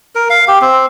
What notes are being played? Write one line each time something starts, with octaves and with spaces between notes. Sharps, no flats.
A#4
F5
G4
C4